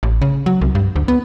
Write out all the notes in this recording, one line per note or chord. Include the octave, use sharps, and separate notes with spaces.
A1
C#3
F#3
C2
G2
D2
B3